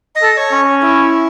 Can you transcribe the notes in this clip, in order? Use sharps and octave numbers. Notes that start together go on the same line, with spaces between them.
D#5
A4
C#5
C#4
E4